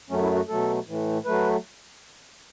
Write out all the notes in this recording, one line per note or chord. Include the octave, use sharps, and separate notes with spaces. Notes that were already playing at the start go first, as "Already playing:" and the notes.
F#2 F#3 A3 C#4
E4
F#4
B2 F#3 A3 A4
A2 E3 A3
F#3 A3 B4